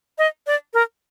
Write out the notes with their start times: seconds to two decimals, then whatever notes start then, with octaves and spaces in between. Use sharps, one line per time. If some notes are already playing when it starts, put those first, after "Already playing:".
0.18 D#5
0.47 D5
0.74 A#4